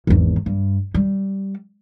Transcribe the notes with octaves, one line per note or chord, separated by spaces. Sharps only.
G#1 E2
G2
G3